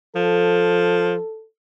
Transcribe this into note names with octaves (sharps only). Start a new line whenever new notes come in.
F3 A4